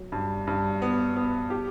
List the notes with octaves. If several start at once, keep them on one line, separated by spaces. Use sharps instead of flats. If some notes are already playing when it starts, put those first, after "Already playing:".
Already playing: F#3
G2
G2
B3
B3
G4